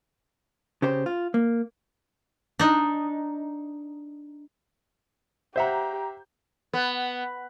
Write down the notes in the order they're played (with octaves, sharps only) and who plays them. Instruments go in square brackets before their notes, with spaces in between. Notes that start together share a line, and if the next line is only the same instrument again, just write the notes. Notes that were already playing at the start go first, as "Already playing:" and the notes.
[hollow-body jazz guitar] C#3 G4 C5
F4
A#3
[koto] D4 D#4
[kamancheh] G4 [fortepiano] C5 E5 F#5 [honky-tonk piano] A#5 G6
[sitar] B3